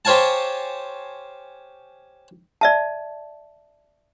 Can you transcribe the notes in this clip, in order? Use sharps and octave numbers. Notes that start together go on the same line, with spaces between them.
G4 C5 C#5 F5 G#5 A5
D5 E5 A5